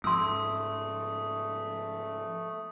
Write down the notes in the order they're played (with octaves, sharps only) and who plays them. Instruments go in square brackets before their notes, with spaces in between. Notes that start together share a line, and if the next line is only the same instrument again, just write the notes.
[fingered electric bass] G#2 F3 [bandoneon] A3 [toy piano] C6 E6 [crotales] D#6